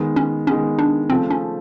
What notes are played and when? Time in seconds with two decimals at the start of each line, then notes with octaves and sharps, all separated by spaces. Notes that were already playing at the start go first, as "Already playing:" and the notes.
Already playing: D#3 G#3 B3
0.16 C#4
0.47 D#3 G#3 B3 C#4
0.79 D4
1.10 C#3 F3 A3 C4
1.31 C#4